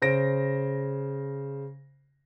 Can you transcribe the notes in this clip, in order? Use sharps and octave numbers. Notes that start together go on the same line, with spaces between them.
C#3 C5 A#6 D7